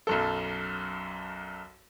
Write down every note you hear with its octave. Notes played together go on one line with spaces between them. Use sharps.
B1 F#2 A4